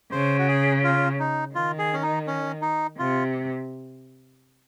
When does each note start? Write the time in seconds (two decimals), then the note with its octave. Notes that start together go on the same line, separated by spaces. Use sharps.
0.12 C#3 C5
0.39 F#4
0.48 G#4
0.84 F4
1.19 D#4
1.54 D#3 F4
1.79 G#4
1.93 C#4
2.02 D#4
2.27 C#4
2.62 D#4
2.98 C3 F4